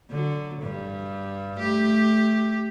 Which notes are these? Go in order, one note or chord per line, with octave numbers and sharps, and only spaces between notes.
D3 F#3
G2
A3 G4